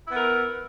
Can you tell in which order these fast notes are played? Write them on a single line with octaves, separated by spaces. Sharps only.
E4 B3 A#4